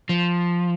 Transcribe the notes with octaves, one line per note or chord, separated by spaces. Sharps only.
F3